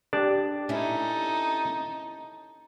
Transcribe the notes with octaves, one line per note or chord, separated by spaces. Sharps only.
D4 G4 D5 A5
C#4 D#4 E4 A4